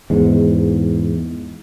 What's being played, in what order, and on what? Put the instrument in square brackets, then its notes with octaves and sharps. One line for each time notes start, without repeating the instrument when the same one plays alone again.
[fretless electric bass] E2 G#2